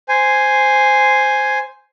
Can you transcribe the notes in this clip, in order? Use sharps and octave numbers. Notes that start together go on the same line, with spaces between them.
C5 G#5